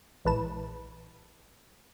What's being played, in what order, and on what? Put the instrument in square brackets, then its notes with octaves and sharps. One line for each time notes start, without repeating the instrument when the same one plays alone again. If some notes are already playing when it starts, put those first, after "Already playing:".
[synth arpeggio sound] A#1 E3 G#3 B4 A5 E7